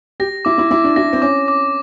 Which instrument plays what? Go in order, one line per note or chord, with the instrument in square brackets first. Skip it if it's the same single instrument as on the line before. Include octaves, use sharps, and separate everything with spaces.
[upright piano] G4 [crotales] A#6
[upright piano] E4 [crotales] D6
[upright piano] E4
[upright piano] E4 [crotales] D6
[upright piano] D4
[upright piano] E4 [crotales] A#6
[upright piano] C4
[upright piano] C#4 [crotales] D6
[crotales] D6